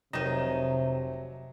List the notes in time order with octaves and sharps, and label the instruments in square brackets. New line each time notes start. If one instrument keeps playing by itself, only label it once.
[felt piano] F1 D#7 [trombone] C3 [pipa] D#3 D#4 [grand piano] F#3 A#6 E7